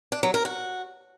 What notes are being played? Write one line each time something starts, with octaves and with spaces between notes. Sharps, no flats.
D4
F#3
A#4
F#4